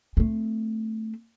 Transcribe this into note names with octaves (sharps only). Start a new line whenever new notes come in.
A3 C4